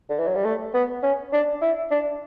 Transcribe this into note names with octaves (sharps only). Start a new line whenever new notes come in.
D3
E3
F#3
G3
A3
B3
C#4
D4
E4
D4